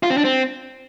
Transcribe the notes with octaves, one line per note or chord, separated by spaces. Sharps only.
F4
C4
D4
C4